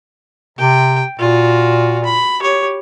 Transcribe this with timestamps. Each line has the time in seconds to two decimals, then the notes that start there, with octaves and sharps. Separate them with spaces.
0.59 C3 G5
1.19 A#2 F4 F#4
2.04 B5
2.40 G4 C#5